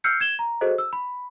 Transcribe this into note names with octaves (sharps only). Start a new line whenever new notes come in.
E6 F6 G6 C7 C#7
G#6 E7 G7
A#5
F#4 G#4 A4 C5 D#5
E6
B5